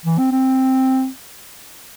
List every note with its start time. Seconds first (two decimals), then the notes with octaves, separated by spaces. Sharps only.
0.06 E3
0.18 C4
0.31 C4